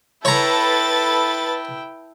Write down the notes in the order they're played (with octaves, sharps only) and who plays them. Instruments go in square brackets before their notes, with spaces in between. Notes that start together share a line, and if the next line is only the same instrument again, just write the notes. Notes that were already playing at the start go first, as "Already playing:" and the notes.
[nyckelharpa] E4 G5 [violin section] A4 B4 A6 [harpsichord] C#5 A#5